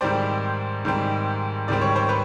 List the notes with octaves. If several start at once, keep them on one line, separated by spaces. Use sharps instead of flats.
G#2 D#3 G3 C4 C5 D5
G#2 D#3 G3 C4
G#2 D#3 G3 C4 D5
C#5
C5
B4 C#5